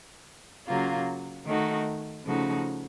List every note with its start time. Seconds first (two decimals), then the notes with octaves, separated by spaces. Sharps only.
0.67 C#3 F#3 A#3 F4
1.46 D#3 A3 D#4 F#4
2.25 C#3 F3 A3 D#4 F#4